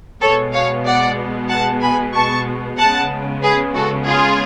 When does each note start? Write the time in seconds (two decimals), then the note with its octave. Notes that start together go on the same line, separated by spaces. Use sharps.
0.21 B2 G#3 B3 A4 C#5
0.53 C#5 F5
0.86 D5 F#5
1.50 F#5 A5
1.82 G#5 B5
2.14 A5 C#6
2.78 C#3 G#3 B3 F#5 A5
3.42 G#4 B4
3.75 F#4 A4
4.07 F4 G#4